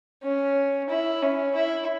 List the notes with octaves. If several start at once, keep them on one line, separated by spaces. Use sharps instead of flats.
C#4
E4
C#4
E4